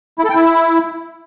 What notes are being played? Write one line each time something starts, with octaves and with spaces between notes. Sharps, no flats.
E4
A4
G5
E4